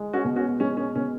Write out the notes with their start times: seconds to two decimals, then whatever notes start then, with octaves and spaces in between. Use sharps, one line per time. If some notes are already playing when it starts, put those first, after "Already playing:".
Already playing: G#3
0.13 C#4 F#4
0.24 B2
0.36 C#4 F#4
0.60 G#3 C#4
0.77 C#4
0.95 B2 C#4